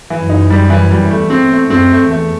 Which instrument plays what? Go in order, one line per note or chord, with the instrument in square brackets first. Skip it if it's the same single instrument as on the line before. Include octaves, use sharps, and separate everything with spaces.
[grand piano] E3
[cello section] F#2
[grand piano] D#4
G3
E3
G3
[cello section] E2 [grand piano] A3
[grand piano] C4
[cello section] E2
[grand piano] A3
[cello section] F#2 [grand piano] C4
[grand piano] A3
[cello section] E2
[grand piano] A3